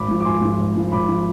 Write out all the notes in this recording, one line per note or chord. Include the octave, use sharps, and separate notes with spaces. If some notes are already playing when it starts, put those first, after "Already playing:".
Already playing: G#1 B5 D6
G#2 F3
D6
G#1 G#5 C6
G#2 F3
G#1
G#2 F3
G#1 B5 D6
F3